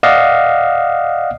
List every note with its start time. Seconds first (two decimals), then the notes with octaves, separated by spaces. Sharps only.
0.03 D5 D#5 F5 F#5